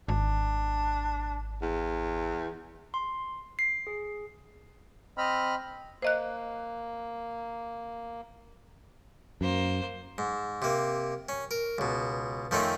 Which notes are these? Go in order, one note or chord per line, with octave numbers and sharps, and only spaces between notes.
G#1 D4
E2
C6
C7
G#4
C4 D#5 B5 F6
A#3 C5 D#5 F#6
F#2 A#3 C5
G#2
C3 A#3
C#4
A#4
C#2 B2
F2 D#3 A3 C4 C#4 D#4